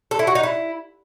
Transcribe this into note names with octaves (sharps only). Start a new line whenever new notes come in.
A4
E4
F#4
D#4
E4